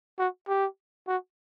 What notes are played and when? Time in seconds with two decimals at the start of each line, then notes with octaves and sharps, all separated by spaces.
0.19 F#4
0.48 G4
1.07 F#4